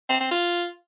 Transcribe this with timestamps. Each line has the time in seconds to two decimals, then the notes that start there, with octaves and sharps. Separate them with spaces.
0.10 C4
0.20 C4
0.31 F4